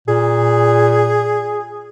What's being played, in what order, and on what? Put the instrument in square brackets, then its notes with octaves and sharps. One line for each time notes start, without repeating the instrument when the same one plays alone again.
[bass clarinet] A#2 [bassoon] G#4